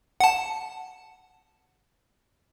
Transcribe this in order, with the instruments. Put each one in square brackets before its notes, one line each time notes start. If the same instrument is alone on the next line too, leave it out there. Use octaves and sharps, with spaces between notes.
[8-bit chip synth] F#5 A5